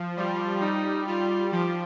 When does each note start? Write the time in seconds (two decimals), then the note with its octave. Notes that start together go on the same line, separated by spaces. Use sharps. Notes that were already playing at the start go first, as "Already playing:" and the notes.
Already playing: F3
0.17 G3 F4
0.61 G3 D#4
1.06 G3 F4
1.52 F3 G4